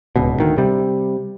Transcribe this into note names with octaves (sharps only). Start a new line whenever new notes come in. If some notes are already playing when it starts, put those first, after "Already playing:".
D1 C#2 B2
D2 D#3
C3 G3